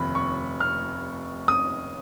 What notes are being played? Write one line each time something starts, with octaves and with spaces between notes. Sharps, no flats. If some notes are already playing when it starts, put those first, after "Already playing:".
Already playing: F1 D#2 B5
C#6
F6
D#6